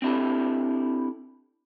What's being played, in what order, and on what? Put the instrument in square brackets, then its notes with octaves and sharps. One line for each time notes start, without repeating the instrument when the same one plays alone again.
[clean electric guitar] C4 D4 E4 G4 A4